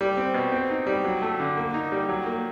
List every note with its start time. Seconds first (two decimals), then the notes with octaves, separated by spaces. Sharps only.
0.01 G3
0.17 C4
0.34 B2
0.52 C4
0.70 D#4
0.87 G3
1.05 F#3
1.22 A3
1.40 D3
1.57 A#3
1.74 D#4
1.92 G3
2.09 F#3
2.26 A#3